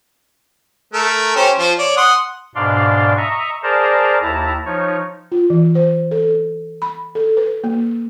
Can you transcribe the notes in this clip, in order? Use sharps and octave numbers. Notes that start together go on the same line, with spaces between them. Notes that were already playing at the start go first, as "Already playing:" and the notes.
A3 A#4
C#4 G4 C5
F3 C5
C#5 D5
F#5 C6 D#6
G#2 B2 D4 D5 F5 C6
D#5 E5 A#5 C#6
G#4 A#4 C5 D5 A5 A#5
D#2 E4 A5 A#5
F3 D#4 C#5
F4
E3
C5
A4
B5
A4
B4
A#3